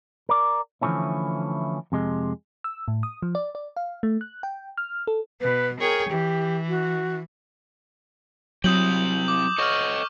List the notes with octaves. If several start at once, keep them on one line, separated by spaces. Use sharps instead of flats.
A#4 D5
D3 E3 F3 A3 C#4 E4
F2 C3 G#3
E6
A2
D#6
F3
D5
D5
F5
A3
F#6
G5
F6
A4
B2 B4
G#4 A#4 C#5 G5
E3 G4
F#4
F#3 C4 E4 G4 D#6 G6 F#7
D6
A4 C#5 D#5 C#6 F6